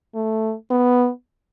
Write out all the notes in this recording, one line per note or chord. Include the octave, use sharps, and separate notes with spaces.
A3
B3